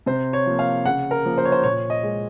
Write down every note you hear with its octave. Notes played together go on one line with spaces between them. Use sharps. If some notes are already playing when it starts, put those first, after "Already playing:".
C3 C5
C#5
F3 A#3
F5
C#3 F#5
A#4
F3 A#3
C5
C#5
C5
A#2 C#5
D#5
G#3